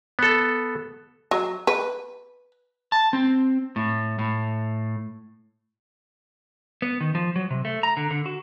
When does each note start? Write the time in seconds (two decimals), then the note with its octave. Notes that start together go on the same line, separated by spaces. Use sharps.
0.19 B3 A4
1.31 F#3
1.67 B4
2.92 A5
3.13 C4
3.76 A2
4.19 A2
6.82 B3
7.01 D#3
7.15 F3
7.36 F#3
7.51 C3
7.65 A3
7.83 A#5
7.97 D3
8.11 D3
8.26 F#4